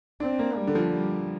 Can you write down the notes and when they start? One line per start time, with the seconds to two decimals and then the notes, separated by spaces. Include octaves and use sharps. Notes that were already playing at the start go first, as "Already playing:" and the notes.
0.20 C4 D4
0.39 A#3
0.56 G3
0.67 D3
0.75 F3
0.92 G3